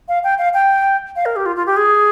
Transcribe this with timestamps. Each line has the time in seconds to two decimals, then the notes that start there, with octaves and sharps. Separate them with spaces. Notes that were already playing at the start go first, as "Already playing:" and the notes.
0.09 F5
0.24 G5
0.38 F5
0.54 G5
1.16 F5
1.26 A#4
1.36 G4
1.46 F4
1.56 F4
1.66 G4
1.77 G#4